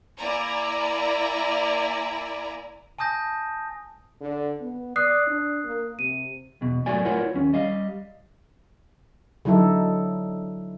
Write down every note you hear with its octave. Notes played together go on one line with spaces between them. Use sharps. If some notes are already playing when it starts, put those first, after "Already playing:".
A#3 E4 D5 G#5 A#5
G#5 A5 D#6 G6 A#6
D3
B3
D5 D#6 F#6 C7
D4
A#3
C3 D#7
E2 B2
F#2 A2 A3 F#4 D5 G#5
E4 F4 A#4 B4 C#5 F#5
D#2 C#4
G3 D#5 F5
D3 F#3 D#4 E4 A4